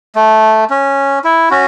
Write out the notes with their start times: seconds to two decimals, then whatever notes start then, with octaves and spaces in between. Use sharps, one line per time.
0.16 A3
0.70 C#4
1.24 E4
1.51 C#4 F#4